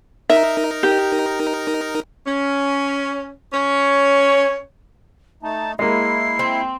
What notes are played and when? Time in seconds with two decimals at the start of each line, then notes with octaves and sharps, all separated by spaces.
0.30 D#4 A#4 E5
0.83 G4
2.27 C#4
3.53 C#4 C#5
5.43 A3 D#4 A5
5.79 G#3 A#3 E4 C7
6.39 C4